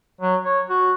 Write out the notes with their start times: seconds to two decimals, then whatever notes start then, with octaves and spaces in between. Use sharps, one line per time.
0.21 F#3
0.45 C#5
0.69 F#4